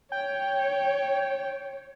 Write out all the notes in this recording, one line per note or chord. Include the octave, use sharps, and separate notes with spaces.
C#5 G5